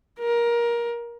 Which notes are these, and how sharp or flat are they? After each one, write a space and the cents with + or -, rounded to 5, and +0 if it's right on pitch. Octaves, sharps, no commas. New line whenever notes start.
A#4 +20